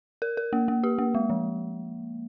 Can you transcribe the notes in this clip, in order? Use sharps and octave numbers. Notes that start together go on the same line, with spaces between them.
A#4
A#4
A#3
A#3
G4
A#3
G#3
F3